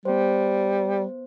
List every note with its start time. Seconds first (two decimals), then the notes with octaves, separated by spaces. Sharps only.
0.05 G3 B3 C5